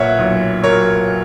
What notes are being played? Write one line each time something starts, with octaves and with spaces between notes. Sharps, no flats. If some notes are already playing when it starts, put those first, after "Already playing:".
Already playing: B1 A#2 B4 C#5 E5 F#5
B1
F#3 A#4 C#5